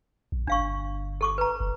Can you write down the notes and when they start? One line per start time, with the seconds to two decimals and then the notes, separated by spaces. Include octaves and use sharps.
0.32 A#1
0.47 G1 D4 F5 C#6
1.21 A4 C#6 D6
1.38 B4 A#5
1.60 F#1